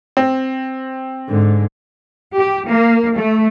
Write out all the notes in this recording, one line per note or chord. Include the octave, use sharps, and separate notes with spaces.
C4
G#2 D3
G4
A#3
A3